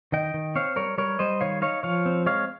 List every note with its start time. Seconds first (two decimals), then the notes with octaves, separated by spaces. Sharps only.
0.12 D#3 D#5 G5
0.34 D#3
0.55 C4 C#5 F5
0.76 G3 A#4 C#5
0.98 G3 A#4 C#5
1.19 G3 C5 D#5
1.41 D#3 C#5 F5
1.62 D#4 C#5 F5
1.83 F3 C#5 F5
2.06 C4
2.26 G#3 C#5 F5